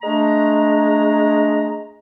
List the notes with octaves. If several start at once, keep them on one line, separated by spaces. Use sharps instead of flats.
G#3 A3 D4 A#5